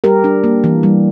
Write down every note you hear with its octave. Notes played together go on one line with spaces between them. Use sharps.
G3 G4 A#4
D4
A#3
E3
G3